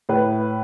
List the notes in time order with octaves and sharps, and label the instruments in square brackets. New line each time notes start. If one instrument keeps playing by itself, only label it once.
[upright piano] A2 B4